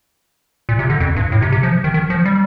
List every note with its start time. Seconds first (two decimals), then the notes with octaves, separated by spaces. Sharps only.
0.69 A#2
0.79 C3
0.90 D3
1.00 F2
1.16 G2
1.32 A2
1.42 C3
1.52 C3
1.63 F3
1.84 D#3
1.94 D#3
2.10 F3
2.25 G3